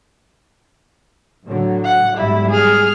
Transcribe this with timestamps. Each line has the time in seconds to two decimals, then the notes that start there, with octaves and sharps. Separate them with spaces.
1.46 A2 D3 F#3
1.84 F#5
2.17 B1 G#2 G3 E4
2.50 G#4 F6